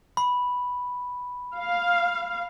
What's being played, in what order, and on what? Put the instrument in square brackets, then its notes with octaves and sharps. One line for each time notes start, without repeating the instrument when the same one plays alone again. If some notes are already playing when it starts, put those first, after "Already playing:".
[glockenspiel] B5
[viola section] F5